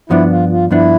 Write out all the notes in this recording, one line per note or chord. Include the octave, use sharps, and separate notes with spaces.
G2 F3 B3 D4 E4
F4
F4
G2 F3 B3 D4 E4